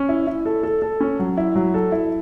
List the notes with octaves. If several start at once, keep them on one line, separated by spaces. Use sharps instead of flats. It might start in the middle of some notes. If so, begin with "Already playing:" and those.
Already playing: C#4
E4
E4
A4
A4
A4
C#4
F#3
E4
F#3
A4
E4